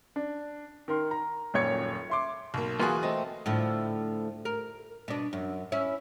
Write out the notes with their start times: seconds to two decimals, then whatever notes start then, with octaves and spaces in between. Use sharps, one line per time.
0.16 D4
0.88 D#3 A#4 C6
1.11 A#5
1.54 D#1 A#1 F#2 C#5 G#6 C#7
2.10 E5 C6 D6
2.54 B1 A#3
2.80 E3 A#3 F4 F#4 G#4
3.03 A3 C4 D#5
3.46 A2 D3 F3
4.45 A#4
5.08 B2 D4
5.33 F#2
5.72 C#4 E4